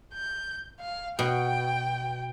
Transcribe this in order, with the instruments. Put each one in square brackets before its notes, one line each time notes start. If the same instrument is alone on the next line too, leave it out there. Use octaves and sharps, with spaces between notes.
[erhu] G6
F5
[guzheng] B2 [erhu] G5